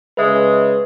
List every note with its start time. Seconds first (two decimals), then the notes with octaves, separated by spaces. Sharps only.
0.17 C#3 G#3 B4 E5